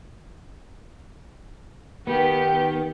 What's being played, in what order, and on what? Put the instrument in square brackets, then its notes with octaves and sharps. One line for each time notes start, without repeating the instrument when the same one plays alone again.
[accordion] D#3 [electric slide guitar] B3 [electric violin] G4